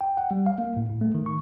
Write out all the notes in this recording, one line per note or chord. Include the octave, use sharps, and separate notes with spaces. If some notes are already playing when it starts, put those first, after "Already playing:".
G5
F#5
G3
F5
A#3
A2
A2
A3
D#3
C#6